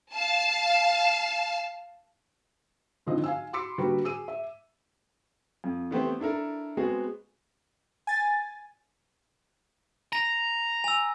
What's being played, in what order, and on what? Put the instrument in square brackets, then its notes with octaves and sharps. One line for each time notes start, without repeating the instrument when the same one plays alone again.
[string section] F5 A5
[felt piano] G#1 D3 F3 C4 D#5
F5 G#5 E6
B5 C6 D6 E6 B6 C#7
D3 G3 A#3 F#4 B4
G#4 E6 D#7
E5
[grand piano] F2
E3 A3 B3 C4 G4 C5
D4 E4 A4 A#4
G#3 B3 C4 F#4 G#4
[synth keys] G#5 A6
[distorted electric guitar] A#5 [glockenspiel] A#6
[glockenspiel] G#5 E6